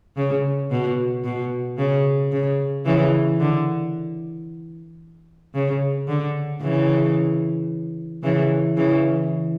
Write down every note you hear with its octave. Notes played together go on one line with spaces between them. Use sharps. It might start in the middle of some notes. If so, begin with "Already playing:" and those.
C#3
B2
B2
C#3
C#3
C#3 E3
D3
C#3
D3
C#3 E3
C#3 E3
C#3 E3